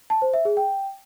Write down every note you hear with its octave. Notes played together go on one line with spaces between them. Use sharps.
A5
C5
E5
G#4
G5